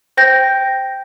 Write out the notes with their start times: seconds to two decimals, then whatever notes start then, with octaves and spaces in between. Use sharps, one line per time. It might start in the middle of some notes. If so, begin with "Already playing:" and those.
0.17 C5 G5 G6 A#6